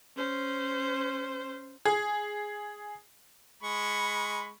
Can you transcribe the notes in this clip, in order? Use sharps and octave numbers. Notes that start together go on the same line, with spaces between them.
C#4 C5
G#4
G#3 B5 C#6